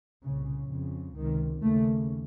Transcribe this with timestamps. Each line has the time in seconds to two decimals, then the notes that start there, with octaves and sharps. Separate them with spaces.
0.23 C2 A#2 C#3
0.70 F2 C#3
1.15 C#2 C3 D#3
1.62 D#2 C#3 A3